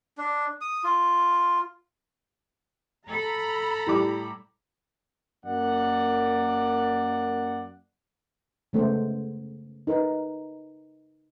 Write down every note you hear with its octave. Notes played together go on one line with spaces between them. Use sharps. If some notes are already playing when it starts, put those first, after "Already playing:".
D4
D#6
F4
A4 A#5 B5
A2 G3 D6
F#2 A#3 D5 F#5
C#3 G#3 A3 B3 A4 C5
D#4 A#4 B4